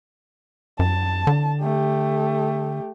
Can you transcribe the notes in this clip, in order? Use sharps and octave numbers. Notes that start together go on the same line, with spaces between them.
F#2 A5
D3
A3 G4